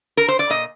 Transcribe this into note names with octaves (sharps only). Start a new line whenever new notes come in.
A#4
C5
D5
A#2 D#5